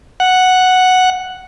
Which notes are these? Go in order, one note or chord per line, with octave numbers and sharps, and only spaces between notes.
F#5